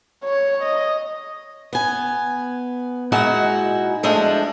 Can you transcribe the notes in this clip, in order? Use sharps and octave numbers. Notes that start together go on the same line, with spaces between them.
C#5
D#5
B3 G#5
A#2 G#3 D#4 E4 F#4 F#5
F3 G#3 A3 D4